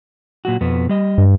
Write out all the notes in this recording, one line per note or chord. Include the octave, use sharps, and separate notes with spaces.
A#2 F#3 F#4
F2 B2 B3
G3 D#5
G2